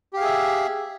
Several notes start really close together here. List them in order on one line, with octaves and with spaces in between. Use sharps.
G4 F5 G#4 E5